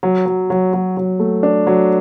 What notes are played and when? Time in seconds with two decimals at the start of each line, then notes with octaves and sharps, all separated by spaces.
0.03 F#3
0.26 F#3
0.50 F#3
0.73 F#3
0.97 F#3
1.20 A3
1.43 D4
1.67 F#3